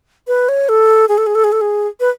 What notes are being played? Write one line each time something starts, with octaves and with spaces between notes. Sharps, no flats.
B4
C#5
A4
G#4
A4
G#4
A4
G#4
A4
G#4
B4